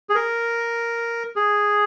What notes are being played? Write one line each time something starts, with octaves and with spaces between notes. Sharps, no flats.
G#4
A#4
G#4